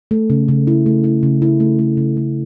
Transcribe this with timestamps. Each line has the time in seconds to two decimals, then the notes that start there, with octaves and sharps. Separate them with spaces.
0.11 A3
0.30 C#3
0.48 C#3
0.67 E4
0.86 A3
1.04 E4
1.23 C#3
1.42 E4
1.60 A3
1.79 A3
1.97 C#3
2.17 A3